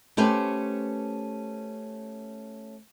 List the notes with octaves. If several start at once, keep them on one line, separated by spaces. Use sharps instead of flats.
A3 C#4 G4 B4 C5